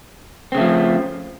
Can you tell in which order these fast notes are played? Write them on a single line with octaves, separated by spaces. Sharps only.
C4 C#3 A3 F3